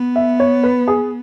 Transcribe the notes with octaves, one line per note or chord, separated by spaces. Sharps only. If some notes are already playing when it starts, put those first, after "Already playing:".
Already playing: B3
E5
C#5
B4
G#4